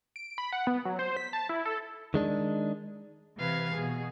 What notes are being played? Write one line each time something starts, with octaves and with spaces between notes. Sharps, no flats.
D7
B5
F#5
B3
F#3
C5
B6
A5
E4
A4
D#3 G#3 D4
C3 E3 B4 F5 G#6
B2 G#4